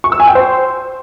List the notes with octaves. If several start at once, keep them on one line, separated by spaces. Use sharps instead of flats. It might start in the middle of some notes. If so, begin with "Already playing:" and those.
C#6
E6
G#5
G5
C5